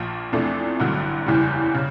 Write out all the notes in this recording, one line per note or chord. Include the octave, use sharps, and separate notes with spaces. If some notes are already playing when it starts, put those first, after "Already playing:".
Already playing: A#1 A#2 F3
E2 C3 F3 A3 D4
A1 G2 D3 F#3
F#1 E2 C#3 E3 G3
C#3